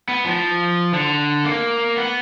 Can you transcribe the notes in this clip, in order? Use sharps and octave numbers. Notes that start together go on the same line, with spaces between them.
B3
F3
D3
A#3
B3